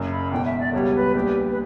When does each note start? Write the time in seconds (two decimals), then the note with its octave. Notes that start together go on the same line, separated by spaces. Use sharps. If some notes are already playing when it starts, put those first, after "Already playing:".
Already playing: F#1 F#2 C#3
0.10 B5
0.32 E1 E2 B2 G5
0.45 E5
0.59 D5
0.73 C#2 B2 G3 C#5
0.95 B4
1.15 A#1 A#2 G3 G4
1.50 B4